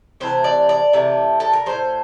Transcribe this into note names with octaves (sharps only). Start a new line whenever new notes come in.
C3 E3 A3 C5
D5
D5
C3 E3 A3
A4
A#4
A2 G3 C5